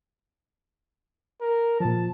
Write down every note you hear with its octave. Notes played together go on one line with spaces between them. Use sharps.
A#4
A#2 F3 A5